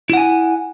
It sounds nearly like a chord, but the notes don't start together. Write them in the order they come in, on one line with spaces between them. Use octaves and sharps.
E4 F#5 G#5